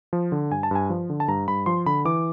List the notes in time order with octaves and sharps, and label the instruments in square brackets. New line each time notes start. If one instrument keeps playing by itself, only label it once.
[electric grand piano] F3
D3
G2 G#5
A5
G2 G#5
F3
D3
A5
G2 A#5
G2 B5
F3 C6
D3 B5
E3 D6